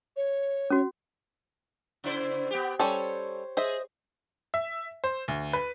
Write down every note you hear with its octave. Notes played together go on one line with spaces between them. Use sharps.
C#5
C#4 F#4
C#3 E4 C5
B3 G4
G3 C#4 A4 C5 C#5
G#4 C5 D#5 E5
E5
C5
D2
B4